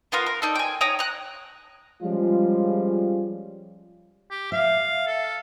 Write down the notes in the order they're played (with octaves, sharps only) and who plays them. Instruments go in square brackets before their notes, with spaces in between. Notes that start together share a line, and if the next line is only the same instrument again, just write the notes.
[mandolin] B3 F4 A#4
A#4
D4 D#4 A4
G5 G#5
C#5 G5 A#5 D#6
A#5 F#6
[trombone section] F3 G3 G#3 C#4 F4
[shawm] G4
[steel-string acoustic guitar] E5 [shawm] F5
[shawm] A4